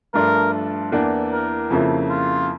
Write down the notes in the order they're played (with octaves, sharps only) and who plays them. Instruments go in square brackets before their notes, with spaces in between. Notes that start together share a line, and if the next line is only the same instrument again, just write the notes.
[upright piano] G2 F3 A3 D4 F4 [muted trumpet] A#4
[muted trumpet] A4
[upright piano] E2 E3 A#3 D4 [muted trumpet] A4
[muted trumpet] A#4
[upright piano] F2 C#3 F3 A#3 E4
[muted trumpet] F4